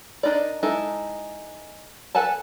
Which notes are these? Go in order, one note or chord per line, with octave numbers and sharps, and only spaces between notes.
D4 D#4 A#4 D5
G#3 D#4 E4 A4
A4 B4 F#5 G#5 A5